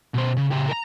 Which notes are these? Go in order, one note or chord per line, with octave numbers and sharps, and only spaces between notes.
B2 C5
C#3
C#3 G4
A#4 A#5